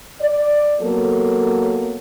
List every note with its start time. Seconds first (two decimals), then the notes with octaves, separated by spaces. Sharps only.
0.21 D5
0.81 F#3 A#3 B3 A4